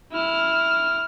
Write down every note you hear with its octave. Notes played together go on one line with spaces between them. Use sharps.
E4 F6